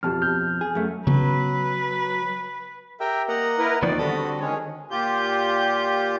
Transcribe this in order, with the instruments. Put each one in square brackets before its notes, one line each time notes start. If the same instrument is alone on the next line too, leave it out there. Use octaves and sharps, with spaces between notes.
[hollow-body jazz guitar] F2 B2 F3 [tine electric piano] G4 A5 F6
[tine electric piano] F6 G6
[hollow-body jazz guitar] G#4
F#2 A3
[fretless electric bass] C#3 B3 [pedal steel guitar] F#3 [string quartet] B4
[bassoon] G4 [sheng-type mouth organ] A#4 E5 G5
[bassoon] A#3 [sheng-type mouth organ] D#5 F#5 A#5
[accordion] E4 A#4 B4
[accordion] D#2 D5 [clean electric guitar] D#3 F3 B3 [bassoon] C4
[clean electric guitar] D3 A4 [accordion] G3 F#4 [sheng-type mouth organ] B5 D#6
[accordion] D#3 G#3 C#4 [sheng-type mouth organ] G#4 C#5
[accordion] A#2 F4 G4 G6